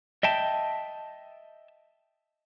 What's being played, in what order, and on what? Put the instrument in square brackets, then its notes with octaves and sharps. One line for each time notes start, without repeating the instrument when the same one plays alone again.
[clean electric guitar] D#5 E5 G5 A5